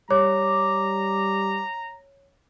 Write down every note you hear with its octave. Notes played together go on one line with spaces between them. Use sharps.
G3 C#5 A#5 D6